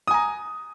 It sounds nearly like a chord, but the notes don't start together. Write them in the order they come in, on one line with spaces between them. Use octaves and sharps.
D#6 G#5 A#5